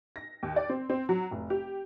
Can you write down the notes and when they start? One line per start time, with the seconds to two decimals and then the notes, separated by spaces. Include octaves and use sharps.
0.16 A#6
0.43 D#2
0.56 D5
0.69 C4
0.90 C4
1.09 F#3
1.31 F1
1.50 G4